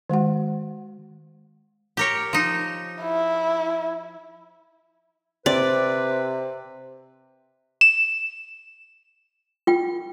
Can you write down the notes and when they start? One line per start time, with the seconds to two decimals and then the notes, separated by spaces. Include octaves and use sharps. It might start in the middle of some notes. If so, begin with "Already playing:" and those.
0.10 D#3 G#3 F#4 F#5
1.97 G4 A#4 C#5
2.33 F3 D#4
3.02 E4
5.46 C3 C4 B4 D5
7.81 E7
9.67 F4 G5